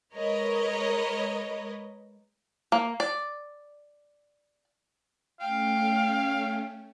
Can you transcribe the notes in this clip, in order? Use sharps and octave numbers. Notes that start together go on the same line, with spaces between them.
G#3 A#4 B4 C#5 D#5
A#3
D5
A3 C#4 F5 G5